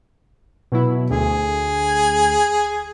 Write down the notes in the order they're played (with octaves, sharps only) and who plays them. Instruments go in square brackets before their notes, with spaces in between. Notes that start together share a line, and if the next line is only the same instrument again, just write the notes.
[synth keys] B2 F#3 E4
[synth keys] D2 [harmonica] G#4